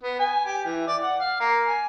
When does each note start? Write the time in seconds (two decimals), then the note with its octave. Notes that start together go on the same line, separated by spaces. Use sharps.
0.04 B3
0.19 G#5
0.45 G4
0.65 E3
0.87 D5
1.02 F#5
1.20 F5
1.40 A#3
1.67 G#5